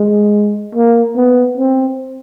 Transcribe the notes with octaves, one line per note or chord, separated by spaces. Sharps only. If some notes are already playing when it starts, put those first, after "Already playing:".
Already playing: G#3
A#3
B3
C4